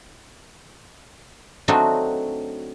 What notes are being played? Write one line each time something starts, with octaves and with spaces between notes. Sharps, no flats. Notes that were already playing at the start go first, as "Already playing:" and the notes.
F#3 A3 C4 D4 D#4 F#4